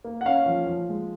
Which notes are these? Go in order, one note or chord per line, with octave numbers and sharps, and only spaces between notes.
A#3
F#5
C#4 F5
F3
F3
G#3